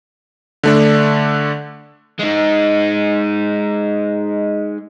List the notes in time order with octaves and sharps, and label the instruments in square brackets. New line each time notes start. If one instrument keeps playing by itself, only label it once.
[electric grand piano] D3 A3 D4
[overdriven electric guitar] G#3 D#4